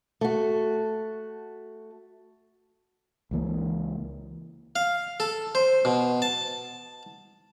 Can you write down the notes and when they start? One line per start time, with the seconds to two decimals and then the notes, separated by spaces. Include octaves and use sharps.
0.21 A3 F#4
3.31 C#2 E3 A#3
4.76 F5
5.20 A4
5.55 C5
5.85 B2
6.22 A5